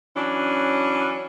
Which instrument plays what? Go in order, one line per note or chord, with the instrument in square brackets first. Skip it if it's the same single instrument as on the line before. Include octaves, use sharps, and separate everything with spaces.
[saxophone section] E3 F#3 C#4 D4